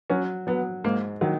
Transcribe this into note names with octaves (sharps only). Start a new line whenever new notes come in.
F#3 C#4
F#3 B3
G#2 A#3
D#3 F#3